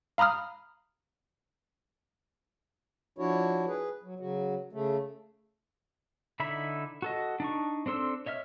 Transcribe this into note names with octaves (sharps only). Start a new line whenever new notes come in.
F5 A#5 B5 D#6 F6
F3 D4 E4 F#4 C#5
G#4 B4
F#3
C#3 F#3 F#4
C#3 A3
D3 D#4 E4 E5 B5
F#4 A4 D#5
D4 D#4 C#6
C4 D4 A4 C6 E6
C#5 D#5 E5 F6